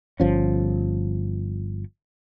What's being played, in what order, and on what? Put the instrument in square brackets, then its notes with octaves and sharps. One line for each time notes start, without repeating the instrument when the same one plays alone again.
[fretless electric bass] G1 F3 C#4